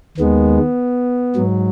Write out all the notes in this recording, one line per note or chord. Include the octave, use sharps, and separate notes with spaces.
D#2 D#3 G#3 B3
G#2 F#3